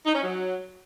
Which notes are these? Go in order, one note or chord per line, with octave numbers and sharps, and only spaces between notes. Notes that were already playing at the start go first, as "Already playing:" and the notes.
D#4
C#4
F#3